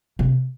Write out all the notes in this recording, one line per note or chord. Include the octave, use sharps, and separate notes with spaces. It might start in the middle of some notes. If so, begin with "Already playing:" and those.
C3